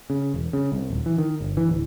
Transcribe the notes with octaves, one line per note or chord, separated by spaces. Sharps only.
C#3
E1
C#3
C2
D#1
E3
D#3
G1
E3
D1